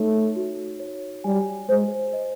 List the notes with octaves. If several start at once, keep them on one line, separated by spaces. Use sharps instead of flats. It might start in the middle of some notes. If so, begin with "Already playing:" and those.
Already playing: A3 D#4 C#5
F#4
C#5
G3 G#5
G#3 C5
D#5